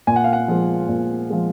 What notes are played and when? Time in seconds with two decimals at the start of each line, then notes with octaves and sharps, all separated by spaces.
0.07 A#2 G#5
0.16 F#5
0.24 F5
0.33 F#5
0.48 F3 G#3
0.89 A#2
1.30 F3 G#3